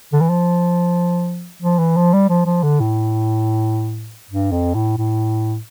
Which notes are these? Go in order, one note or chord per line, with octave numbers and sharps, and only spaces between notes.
D3
E3
F3
F3
E3
F3
G3
F3
F3
D3
A2
G2
F2
A2
A2